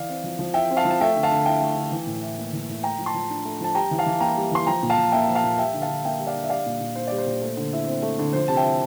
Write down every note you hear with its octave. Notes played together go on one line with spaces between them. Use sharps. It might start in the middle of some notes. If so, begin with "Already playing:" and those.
Already playing: E3 D5 F5
C4
F3
F3
E4 E5 G5
C4
F5 A5
F3
A5
A3 E5 G5
D3
F5 A5
D3
E4 E5 G5
A3
D3
E3
A2
E4
A#3
E3
A2
A3 G5 A#5
F3
A5 C6
F3
D4
A3
F3 A5
G3 G5 A#5
E3
F5 A5
E3
A#3 G5 A#5
G3
E3 C6
F3 G5 A#5
A#2
F5 A5
A#2
A#3 E5 G5
F3
F5 A5
A#2
G3 E5 G5
D3
F5 A5
D3
A#3 E5 G5
G3
D5 F5
D3
E5
G3 D5 F5
A#2
A#2
D4 C5
G3 D5
C5
A#2
A3
D3
E4
C4
A3
D3
F3 C5
C3 A5
E5 G5
E4